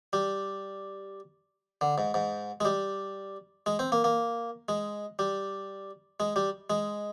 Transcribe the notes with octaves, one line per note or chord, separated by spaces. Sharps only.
G3
D3
G#2
G#2
G#3
G3
G#3
C4
A#3
A#3
G#3
G3
G#3
G3
G#3